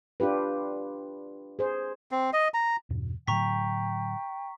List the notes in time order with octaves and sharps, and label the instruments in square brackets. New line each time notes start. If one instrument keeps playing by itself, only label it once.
[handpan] D4 F4 G4 B4
G#4 C5
[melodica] C4
D#5
A#5
[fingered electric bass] E2 G2 B2
[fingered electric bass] A2 D3 F#3 [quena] G5 [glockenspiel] A#5 C#6 B6